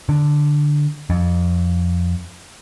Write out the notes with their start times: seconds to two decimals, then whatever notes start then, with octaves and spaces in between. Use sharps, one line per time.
0.09 D3
1.10 F2